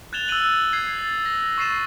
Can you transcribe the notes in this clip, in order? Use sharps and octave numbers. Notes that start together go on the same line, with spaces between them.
F#6 G#6 A6 E7 F7 G7
E6 F#6 A6 D#7 F#7
G#6 C7
A6
A#6
C#6 A6 C7 D#7 E7